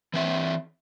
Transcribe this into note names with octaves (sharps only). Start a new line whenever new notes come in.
E3 C4 E5